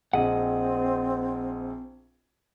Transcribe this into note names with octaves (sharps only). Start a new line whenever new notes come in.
A#1 C4 G#4 D#5 F#5